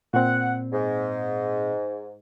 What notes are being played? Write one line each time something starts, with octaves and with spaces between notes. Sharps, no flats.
A#2 C4 F#5
G#2